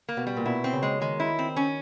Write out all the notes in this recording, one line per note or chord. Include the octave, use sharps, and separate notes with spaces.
A#3
B2
G3
A#2
B2 E4
C4
C#3
G#3
D#3 G#3
E4
C4
C#4